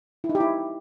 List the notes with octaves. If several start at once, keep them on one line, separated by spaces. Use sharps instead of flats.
E4
D#4
G4
E4